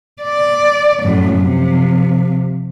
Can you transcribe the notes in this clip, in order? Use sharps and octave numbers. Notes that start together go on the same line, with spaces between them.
D5
F#2 A2
C3 F3